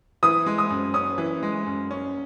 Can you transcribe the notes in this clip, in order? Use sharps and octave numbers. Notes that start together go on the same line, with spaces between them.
E3 D#6
G#3
D#6
F#2
C#4 D#6
E3
G#3
F#2
C#4